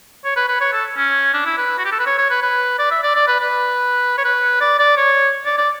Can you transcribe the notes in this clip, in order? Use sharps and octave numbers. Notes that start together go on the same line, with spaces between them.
C#5
B4
B4
C#5
A4
C#4
D4
E4
B4
F#4
G4
A4
B4
C#5
C#5
B4
B4
D5
E5
D5
D5
B4
B4
C#5
B4
D5
D5
C#5
D5
D5